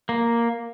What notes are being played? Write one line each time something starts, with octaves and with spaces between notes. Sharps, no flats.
A#3